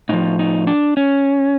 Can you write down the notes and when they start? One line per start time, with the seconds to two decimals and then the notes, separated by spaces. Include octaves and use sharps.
0.09 A2 F3 D#4
0.39 D#4
0.67 D4
0.97 C#4